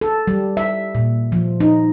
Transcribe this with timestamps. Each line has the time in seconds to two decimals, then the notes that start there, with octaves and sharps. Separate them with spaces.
0.01 A4
0.27 G3
0.57 E5
0.95 A#2
1.32 F3
1.60 D#4